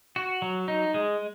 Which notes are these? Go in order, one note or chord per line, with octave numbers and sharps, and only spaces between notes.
F#4
F#3
D#4
G#3